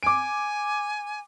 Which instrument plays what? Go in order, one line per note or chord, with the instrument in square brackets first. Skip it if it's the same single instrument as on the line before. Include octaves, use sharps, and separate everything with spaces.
[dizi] G#5 [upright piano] D6 D7